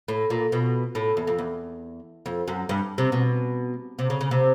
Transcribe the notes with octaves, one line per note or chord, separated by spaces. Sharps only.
A2
A#2
B2
A2
E2
F2
E2
F2
F#2
G2
C3
B2
C3
C#3
C#3
C3